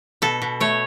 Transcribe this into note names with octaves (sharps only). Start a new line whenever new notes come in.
B2 A4
B2
A3 C#5